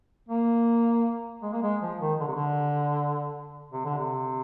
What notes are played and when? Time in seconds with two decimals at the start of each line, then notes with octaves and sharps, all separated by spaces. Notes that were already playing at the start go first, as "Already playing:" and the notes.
0.29 A#3
1.43 G#3
1.53 A#3
1.63 G#3
1.82 F3
2.00 D#3
2.20 D3
2.27 C3
2.35 D3
3.72 C3
3.85 D3
3.98 C3